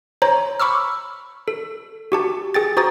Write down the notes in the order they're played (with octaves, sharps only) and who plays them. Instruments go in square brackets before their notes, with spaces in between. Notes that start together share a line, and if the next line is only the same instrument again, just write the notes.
[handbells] C5 C#5 A#5
B5 C#6 D6 E6 F6
A4
F#4 G4 A5
G#4 G5 A6
F#4 C5 A#5 D#6 A6